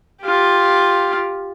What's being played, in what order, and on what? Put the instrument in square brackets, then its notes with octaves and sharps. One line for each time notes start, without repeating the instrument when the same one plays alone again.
[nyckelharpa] F4 G4